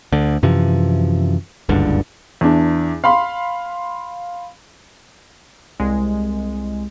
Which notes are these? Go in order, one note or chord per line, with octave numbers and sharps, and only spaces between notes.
D2 D3
F#2 C3 E3 F3
F#1 C#2 G2 D3
E2 D4
F5 B5 C6
C2 G#3